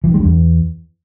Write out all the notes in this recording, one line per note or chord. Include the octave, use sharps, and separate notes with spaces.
E3
D#3
G#3
G2
E2